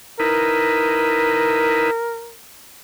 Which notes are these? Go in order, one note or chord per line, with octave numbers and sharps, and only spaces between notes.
D#4 E4 A#4 B4